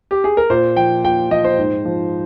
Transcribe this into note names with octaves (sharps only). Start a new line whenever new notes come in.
G4
G#4
A#4
A#2 C5
F3 G5
A#2 G5
F3 D#5
C5
G#2
F3